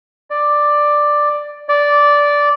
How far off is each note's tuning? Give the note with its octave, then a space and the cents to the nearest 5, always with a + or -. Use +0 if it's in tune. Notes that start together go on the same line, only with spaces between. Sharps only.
D5 +5
D5 -10